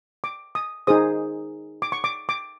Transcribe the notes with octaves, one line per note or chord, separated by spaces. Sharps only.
D6
D#6
D#4 G#4 C5 D#6
D6
C#6
D6
D6